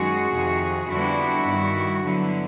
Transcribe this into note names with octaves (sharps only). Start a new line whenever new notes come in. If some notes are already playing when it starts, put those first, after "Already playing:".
Already playing: F#2 D#3 G#3 F#4 G#4
F2 C3 D#3
F2 D3 G3 B3 D4 E4 F#4
G2 D#3 G3
D3 F#3 B3 E4